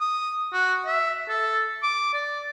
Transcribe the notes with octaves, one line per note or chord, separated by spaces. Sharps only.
D#6
F#4
E5
A4
D6
D5